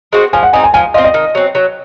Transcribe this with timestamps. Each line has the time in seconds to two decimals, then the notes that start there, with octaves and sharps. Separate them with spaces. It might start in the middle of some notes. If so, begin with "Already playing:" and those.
0.13 G#3 C4 F#4
0.33 F3 G#5
0.43 F#5
0.53 C4 D#4 G#5
0.64 G#5
0.74 F3 G#5
0.94 C4 F4 D#5
1.04 D#5
1.14 D#3
1.35 F#3 C4
1.55 F#3